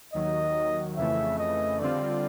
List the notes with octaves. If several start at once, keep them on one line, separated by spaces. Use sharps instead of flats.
D#2 D#3 F#3 D#5
F2 C#3 E3 A3 E5
D#5
D3 G3 C4 F4 D5